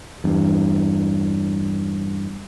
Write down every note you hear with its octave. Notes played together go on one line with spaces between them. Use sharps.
E2 G2